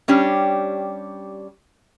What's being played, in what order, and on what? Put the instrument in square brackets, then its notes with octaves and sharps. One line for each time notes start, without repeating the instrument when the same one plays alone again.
[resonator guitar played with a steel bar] G3 C#4 D4 G4